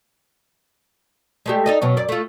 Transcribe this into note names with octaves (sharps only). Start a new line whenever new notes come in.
G#3 A3 G4
D#4 A4 D#5
B2 F#3 C#4
F#2 D5
A3 F4